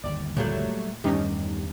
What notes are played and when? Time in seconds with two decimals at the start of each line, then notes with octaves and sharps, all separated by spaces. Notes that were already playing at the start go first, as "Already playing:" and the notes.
0.04 G1 D#2 D5
0.37 A#2 F#3 G3 A3
1.04 E2 G2 D#3 A3 C#4 D#4 G4